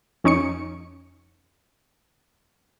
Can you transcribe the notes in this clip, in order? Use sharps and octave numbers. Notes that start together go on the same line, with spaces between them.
F2 C#4 D#4 C#6 C#7